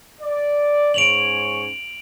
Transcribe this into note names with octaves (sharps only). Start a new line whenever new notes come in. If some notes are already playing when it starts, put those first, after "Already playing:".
D5
G#2 C#4 C#5 D7 F7 F#7